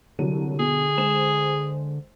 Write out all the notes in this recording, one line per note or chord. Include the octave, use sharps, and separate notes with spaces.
C2 D3 F#3 D#7
B2 G#4
G#3 C5 E7